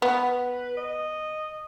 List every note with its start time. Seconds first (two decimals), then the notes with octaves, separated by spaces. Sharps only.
0.02 B3 B4
0.77 D#5